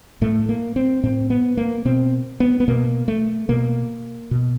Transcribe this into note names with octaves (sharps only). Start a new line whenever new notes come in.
A2 A3
A#3
C4
A2 C4
B3
A#3
B2 C4
B3
B3
B2 A#3
A3
B2 A#3
B2